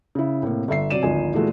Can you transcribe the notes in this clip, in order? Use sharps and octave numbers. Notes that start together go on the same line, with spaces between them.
C#3 E4
A2 C3 A#3
G1 A4 E5 C7
C3 F#3 D5 D#7 E7
G#1 D2 F3 D#5 G#5
A#2 E3 G#3 A3 F#4